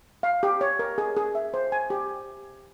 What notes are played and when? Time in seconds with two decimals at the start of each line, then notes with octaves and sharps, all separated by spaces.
0.23 F5
0.43 G4
0.61 C#5
0.79 A#4
0.98 G#4
1.16 G#4
1.35 E5
1.54 C5
1.72 G#5
1.90 G4